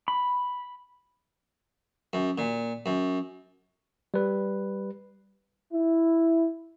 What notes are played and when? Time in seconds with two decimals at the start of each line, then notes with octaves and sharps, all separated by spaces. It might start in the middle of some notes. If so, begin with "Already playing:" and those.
0.08 B5
2.13 F#2
2.38 A#2
2.86 F#2
4.14 G3 B4
5.72 E4